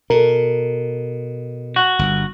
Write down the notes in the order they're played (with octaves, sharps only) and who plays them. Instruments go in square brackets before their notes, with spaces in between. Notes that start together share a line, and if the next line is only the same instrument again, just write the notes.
[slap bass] B2 [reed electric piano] A4 A#4
[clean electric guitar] F#4
[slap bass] G1